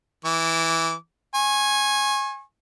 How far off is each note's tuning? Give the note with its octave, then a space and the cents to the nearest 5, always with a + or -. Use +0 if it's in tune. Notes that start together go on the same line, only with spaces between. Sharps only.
E3 -5 D6 -25
G#5 +0 C#6 -40